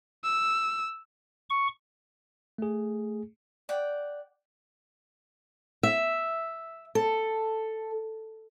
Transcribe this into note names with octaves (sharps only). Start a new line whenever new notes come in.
E6
C#6
A3 G#4
D5 F#5 G5
E5
A4